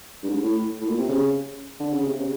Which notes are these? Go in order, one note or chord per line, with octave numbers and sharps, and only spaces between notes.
G2
G#2
A2
A2
A#2
C3
C#3
D3
C#3
C3
C#3